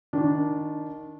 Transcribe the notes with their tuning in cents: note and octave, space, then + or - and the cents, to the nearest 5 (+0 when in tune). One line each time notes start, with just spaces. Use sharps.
D#3 +0 D4 -15